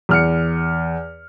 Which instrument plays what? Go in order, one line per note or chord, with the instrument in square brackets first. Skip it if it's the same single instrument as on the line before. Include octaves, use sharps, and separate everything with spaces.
[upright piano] E2 F6 C#7